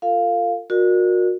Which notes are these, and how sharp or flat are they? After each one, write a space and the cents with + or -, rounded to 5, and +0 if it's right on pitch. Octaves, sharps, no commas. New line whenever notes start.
F4 +0 A4 +40 F5 +0
F#4 -30 A#4 +0 D5 +40